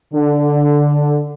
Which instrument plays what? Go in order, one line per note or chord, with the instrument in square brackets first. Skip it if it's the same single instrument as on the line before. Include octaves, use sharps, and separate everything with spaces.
[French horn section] D3